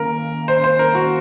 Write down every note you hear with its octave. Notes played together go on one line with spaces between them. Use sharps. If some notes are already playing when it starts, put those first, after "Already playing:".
Already playing: D#3 A#3 C#4 A#4
C5
C5
A#4
F#4